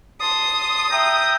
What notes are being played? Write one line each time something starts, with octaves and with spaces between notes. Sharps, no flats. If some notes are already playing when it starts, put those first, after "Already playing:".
A5 C6 D#6
E5 G5 A#5